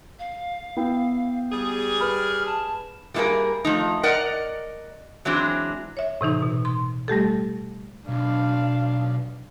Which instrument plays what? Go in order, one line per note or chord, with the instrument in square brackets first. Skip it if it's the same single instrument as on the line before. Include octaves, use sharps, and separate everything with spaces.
[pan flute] F5
[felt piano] B3 E4 G5
[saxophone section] G3 G#4
[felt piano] B4 B5 [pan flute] F6
[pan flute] A5
[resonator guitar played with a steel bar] G3 A#3 E4 G4 G#4 A#4
F3 A3 D#4
A#4 D5 D#5 F#5
E3 F#3 G#3 C4 D4
[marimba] C#5 E5
A2 C3 E3 D#4
B2
C6
G3 A3 G4 A4
[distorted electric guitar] B1 [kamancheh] D4 F5